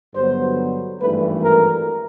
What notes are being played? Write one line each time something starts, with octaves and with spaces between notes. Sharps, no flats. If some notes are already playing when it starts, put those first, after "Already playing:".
G2 D3 F#3 B3 C5
G#1 G2 E3 A3 B4
A#4